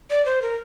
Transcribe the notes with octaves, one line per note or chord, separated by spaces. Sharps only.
D5
C5
A#4